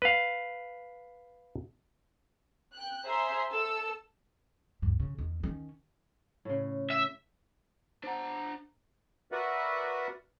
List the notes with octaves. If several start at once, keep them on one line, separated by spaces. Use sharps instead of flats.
B4 F5
G5 F#6
G#4 C5 E5 G#5 A#5 C6
A4 E6
D2 G2
C#3
E2 D#3
D#3 C#4
A2 C#3
E5
D4 C5 F#5 A#5
F#4 A#4 B4 D5 E5 F#5